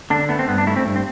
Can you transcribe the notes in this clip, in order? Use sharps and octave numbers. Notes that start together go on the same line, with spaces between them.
D3 D4
A3 B3
C4
G2 B3
D4
A3 E4
C4
G2
C4